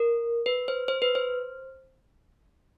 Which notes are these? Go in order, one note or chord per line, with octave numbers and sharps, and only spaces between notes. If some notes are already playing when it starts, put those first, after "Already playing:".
Already playing: A#4
B4
C5
C5
B4
C5